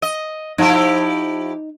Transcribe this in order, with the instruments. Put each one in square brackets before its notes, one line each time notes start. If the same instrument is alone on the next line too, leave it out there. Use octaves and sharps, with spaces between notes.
[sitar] D#5
[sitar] F3 E4 G4 [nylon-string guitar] D#4